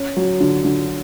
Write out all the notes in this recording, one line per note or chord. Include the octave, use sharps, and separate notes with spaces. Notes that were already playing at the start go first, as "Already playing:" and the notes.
Already playing: C#4
F#3
D3
D3